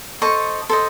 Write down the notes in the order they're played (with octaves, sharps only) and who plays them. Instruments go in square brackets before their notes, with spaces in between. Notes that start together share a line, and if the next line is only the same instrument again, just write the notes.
[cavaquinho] A4 C5 D#5 C#6
A4 C5 D#5 C6